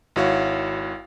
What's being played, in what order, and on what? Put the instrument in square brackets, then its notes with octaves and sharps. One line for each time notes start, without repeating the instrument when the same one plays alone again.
[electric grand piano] G#1 E4 F#4 C#5 F5